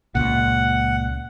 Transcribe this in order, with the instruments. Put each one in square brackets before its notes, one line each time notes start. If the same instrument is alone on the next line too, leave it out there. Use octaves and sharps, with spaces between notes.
[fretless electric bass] C#2 A#2 [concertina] F#5